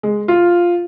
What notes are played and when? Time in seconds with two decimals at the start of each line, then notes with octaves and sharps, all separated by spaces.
0.03 G#3
0.28 F4